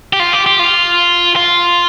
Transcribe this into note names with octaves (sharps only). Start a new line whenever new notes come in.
G4
F4
G4
G4
F4
F4